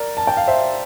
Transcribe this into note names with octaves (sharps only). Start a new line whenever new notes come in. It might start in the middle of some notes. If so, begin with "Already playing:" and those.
Already playing: A#4 D5
A5
G5
F5
C5 E5